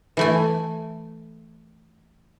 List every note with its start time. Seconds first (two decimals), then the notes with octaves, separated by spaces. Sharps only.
0.17 E3 A3 G#5